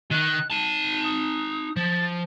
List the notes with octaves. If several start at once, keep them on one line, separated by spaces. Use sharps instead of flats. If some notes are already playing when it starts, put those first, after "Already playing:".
D#3 D#4 F#6
D#4 A5 D#7
D#6
F3 A6